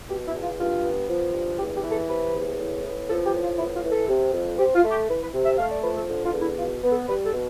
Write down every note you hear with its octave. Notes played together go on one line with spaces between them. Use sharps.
B2 G4
E4
E2
F4
G2 F4
B3
F3
G2
E2 G4
G4
E3
A4
C3 B4
E2
A2
B3
F3 A4
G4
A2
F4
B3 E4
F4
E3
A4
C3
F2
C4 G4
F4
A3
G4
E3 B4
B4
C3
E5
A3 F5
D5
F3 B4
A4
D3
F4
E2
E4
B2 F4
B3
A4
G3 B4
A4
B2